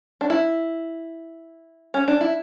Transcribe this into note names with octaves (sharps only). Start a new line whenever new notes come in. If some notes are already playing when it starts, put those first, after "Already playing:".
D4
E4
C#4
D4
E4